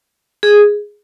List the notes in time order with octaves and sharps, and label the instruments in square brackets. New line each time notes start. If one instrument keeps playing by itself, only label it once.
[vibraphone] G#4